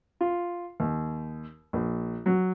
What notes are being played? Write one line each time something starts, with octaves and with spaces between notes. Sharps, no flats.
F4
D#2
A#1
F#3